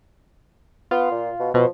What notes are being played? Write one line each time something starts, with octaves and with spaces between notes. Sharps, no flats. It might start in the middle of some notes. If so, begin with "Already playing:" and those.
B3 F4
A#2
B2
B2 F3